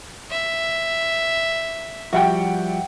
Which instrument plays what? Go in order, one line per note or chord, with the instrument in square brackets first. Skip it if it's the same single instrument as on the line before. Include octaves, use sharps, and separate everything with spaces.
[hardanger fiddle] E5
[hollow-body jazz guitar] F3 G3 F#4 [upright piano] E5 F#5 G5